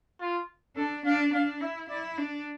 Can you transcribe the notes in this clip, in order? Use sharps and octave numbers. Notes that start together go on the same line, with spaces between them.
F4
D4 A4
D4 F5
D4 F5
E4 E5
E4 D5
D4